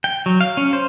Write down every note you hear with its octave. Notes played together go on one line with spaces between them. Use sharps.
G5
F#3
F5
C#4
C5